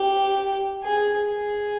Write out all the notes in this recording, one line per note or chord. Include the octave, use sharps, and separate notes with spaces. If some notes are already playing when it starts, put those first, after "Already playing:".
Already playing: G4
G#4
G#4